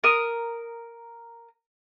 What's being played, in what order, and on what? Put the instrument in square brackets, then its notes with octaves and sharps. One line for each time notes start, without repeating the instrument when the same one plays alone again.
[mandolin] A#4 D#6